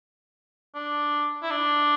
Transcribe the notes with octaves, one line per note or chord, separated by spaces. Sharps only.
D4
E4
D4